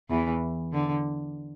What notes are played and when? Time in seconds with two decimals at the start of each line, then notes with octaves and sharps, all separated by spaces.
0.10 E2 E3
0.73 D3